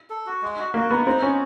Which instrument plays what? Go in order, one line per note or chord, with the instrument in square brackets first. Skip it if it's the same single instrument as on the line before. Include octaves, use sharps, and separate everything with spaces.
[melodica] A4
F#4
G#3
F#4
[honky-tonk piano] A#3 [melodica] F#4
[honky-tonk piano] B3 [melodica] D#4
[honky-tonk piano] C4 [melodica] D#4
[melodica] B3 [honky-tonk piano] C#4